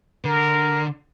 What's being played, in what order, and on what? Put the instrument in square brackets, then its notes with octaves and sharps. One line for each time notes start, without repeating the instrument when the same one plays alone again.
[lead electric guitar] D3 [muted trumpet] A#4